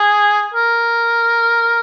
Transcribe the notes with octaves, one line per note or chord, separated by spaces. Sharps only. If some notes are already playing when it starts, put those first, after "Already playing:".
Already playing: G#4
A#4